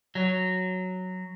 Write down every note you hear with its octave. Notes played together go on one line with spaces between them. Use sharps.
F#3